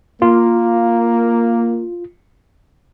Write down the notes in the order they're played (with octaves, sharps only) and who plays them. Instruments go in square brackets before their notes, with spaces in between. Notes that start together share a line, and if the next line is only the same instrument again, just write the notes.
[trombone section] A#3 [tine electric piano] F4